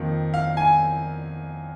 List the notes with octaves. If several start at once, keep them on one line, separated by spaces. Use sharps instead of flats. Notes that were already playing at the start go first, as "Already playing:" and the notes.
Already playing: F2 D#3 A#3
F5
G#5